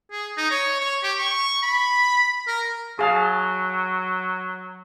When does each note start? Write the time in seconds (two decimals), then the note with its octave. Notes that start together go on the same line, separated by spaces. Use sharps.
0.11 G#4
0.37 D#4
0.51 C#5
0.80 C#5
1.03 G4
1.19 C#6
1.63 B5
2.47 A#4
2.99 F#3 G#4 F5 A5